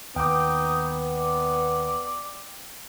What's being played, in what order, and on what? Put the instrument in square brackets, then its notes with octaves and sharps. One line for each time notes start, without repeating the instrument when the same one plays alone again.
[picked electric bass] D#2 [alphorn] B3 [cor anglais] D#4 [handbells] G5 D6
[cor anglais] D5